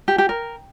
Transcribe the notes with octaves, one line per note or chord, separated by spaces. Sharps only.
G4
G4
A#4